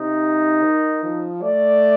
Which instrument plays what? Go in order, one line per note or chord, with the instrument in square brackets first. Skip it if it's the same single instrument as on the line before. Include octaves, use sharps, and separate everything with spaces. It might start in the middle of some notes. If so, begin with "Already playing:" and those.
Already playing: [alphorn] C3 [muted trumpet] D#4
[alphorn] D#3
F3
[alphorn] A3 [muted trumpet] D5